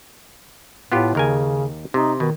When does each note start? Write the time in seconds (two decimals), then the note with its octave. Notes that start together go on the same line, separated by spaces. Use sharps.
0.92 A2 B3 F4 G4
1.15 D#2 C#3 A#4 G#5
1.94 C3 D#4
2.20 B2 D#3